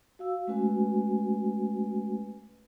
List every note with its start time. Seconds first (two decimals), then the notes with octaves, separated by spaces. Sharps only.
0.19 F#4 F5 E6
0.47 G#3 A3 C#4 F#4 B4 G#5